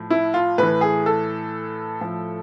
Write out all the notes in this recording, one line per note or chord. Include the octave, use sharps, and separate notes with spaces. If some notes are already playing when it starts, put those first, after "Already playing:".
Already playing: A2 F3
E4
F4
A2 E3 B4
G#4
A4
A2 F3